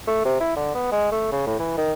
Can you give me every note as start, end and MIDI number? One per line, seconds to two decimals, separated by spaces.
0.07 0.24 57
0.25 0.37 48
0.40 0.51 64
0.56 0.71 50
0.74 0.89 59
0.92 1.07 56
1.11 1.30 57
1.32 1.46 49
1.47 1.58 45
1.59 1.76 52
1.78 1.93 51